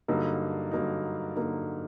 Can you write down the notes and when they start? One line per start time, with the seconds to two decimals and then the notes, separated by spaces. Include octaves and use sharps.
0.08 G2 D3 F#3 A#3 D#4
0.71 G2 D3 F#3 A#3 D#4
1.35 G2 D3 F#3 A#3 D#4